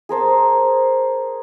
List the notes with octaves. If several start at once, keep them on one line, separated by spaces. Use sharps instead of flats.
G#4 A#4 C5 A5